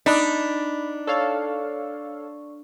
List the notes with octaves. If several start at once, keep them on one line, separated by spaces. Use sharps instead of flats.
D4 D#4 B5 B6
A4 C#5 D5 F5 C#6